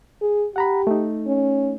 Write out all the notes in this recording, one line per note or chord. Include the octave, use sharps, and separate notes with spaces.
G#4
G4 F#5 A#5 B5
A3 D#4
C#4